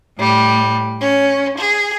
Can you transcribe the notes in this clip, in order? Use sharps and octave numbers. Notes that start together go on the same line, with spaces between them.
A2 G3
C#4
G#4